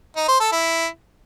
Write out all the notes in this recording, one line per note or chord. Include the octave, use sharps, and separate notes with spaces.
D#4
C5
A4
E4